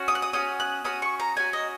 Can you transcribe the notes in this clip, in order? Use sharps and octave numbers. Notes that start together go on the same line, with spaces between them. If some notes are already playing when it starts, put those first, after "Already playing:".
Already playing: C#4 F#4
D#6
F#6
D#6
C#4 F#4 D#6
F#6
C#4 F#4 D#6
C#6
A#5
C#4 F#4 G#5
D#5